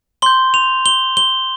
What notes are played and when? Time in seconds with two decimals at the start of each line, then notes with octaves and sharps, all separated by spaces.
0.22 C6 G6 G7
0.54 F7
0.86 G7
1.17 G7